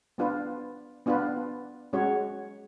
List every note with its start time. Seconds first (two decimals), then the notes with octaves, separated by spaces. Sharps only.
0.18 B3 D4 F4 B4
1.06 B3 D4 F4 B4
1.93 G#3 C#4 F#4 C#5